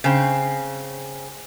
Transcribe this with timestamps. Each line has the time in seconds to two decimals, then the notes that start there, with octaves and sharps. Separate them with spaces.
0.04 C#3 C4